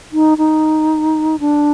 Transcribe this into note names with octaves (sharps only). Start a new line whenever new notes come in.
D#4
D#4
D4